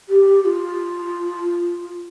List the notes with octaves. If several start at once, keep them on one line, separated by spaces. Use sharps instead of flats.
G4
G4
F4